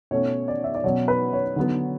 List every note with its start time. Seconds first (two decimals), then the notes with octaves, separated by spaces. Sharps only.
0.11 B2 A3 C#4 C#5
0.48 D5
0.64 E5
0.75 D5
0.84 B2 F#3 C#4 C#5
1.08 B4
1.33 C#5
1.56 D3 F#3 B3